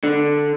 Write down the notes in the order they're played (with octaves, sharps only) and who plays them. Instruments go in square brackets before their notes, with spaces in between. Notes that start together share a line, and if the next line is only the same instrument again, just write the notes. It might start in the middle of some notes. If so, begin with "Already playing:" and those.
[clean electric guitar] D3